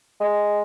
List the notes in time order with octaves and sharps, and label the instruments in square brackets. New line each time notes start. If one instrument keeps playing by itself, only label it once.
[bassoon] G#3